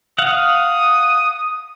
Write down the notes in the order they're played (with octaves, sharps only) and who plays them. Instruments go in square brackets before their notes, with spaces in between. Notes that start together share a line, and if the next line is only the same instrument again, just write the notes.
[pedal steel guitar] F5 F#5 [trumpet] D#6